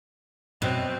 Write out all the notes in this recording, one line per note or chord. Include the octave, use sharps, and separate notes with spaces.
F#2 B2 C4